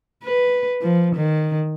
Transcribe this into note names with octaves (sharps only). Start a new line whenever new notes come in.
B4
F3
D#3